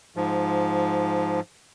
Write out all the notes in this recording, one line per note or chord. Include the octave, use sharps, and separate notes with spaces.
G#2 F3